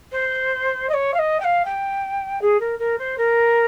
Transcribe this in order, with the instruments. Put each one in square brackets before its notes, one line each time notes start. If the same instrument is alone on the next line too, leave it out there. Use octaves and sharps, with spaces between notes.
[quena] C5
D#5
C#5
F5
D#5
G5
F5
G5
G#4
A#4
A#4
C5
A#4